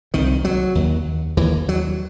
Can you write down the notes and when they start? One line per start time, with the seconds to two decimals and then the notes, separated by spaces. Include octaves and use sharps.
0.14 C2 C3 D#3
0.45 F#3
0.75 D#2
1.37 D#2 E3
1.69 F#3